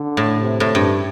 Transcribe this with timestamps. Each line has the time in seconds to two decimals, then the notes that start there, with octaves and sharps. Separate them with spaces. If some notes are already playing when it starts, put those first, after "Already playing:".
Already playing: D3
0.17 A2
0.40 C3
0.60 A2
0.75 G2